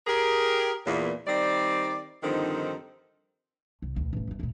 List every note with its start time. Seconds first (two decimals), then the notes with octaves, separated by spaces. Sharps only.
0.07 G4 G#4 A#4
0.85 E2 A#2
1.27 D#3 G3 C4 D5
2.23 G2 D3 D#3 F3 C4 D#4
3.82 C2
3.96 D2 B2
4.13 E1 A1
4.27 G1 G#2
4.40 D2 A#2